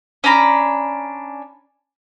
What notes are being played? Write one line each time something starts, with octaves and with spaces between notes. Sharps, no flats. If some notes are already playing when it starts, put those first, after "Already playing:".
C#4 D4 A#5 B5